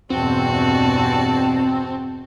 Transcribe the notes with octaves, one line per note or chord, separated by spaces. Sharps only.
E2 G2 B2 C4 F#4 A5